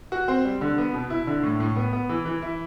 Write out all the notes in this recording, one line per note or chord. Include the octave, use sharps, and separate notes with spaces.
F#4
C4
G3
D3
B3
B2
E4
D3
A2
A2
B3
B3
E3
E3
E4